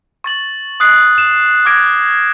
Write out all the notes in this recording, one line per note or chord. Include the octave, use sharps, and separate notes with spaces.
C#6 A6 F#7
D#6 F#6 C7
E7
D6 F6 F#6 G#6 A#6 D7